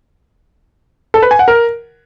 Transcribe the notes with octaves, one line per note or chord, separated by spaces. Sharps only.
A4
B4
G#5
F#5
A#4